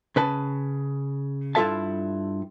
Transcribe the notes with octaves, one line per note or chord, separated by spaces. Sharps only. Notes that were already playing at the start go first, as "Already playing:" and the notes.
C#3 B4 A5
G2 E4 F4 A4 E5 A5